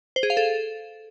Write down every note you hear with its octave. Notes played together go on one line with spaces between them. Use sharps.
C5
G#4
F5
A4